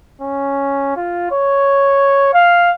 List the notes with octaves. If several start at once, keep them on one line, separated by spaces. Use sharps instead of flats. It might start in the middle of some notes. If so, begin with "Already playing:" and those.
C#4
F4
C#5
F5